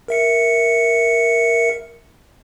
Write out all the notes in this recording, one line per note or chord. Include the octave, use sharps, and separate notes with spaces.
A#4 E5 C#7